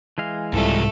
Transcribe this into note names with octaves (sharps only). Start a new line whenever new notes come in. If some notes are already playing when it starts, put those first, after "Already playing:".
E3 G#3 F5
C2 G#2 A3 F4 A4